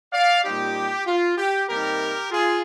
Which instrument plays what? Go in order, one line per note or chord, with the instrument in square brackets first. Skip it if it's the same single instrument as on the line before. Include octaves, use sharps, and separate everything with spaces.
[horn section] D5 F5
A#2 G3 C4 D#4 G4
F4
G4
C3 G3 A#3 D#4 G4 A#4
F4 G#4